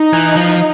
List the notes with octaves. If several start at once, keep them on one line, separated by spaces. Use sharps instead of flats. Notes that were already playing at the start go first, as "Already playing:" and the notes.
Already playing: D#4
E3
F3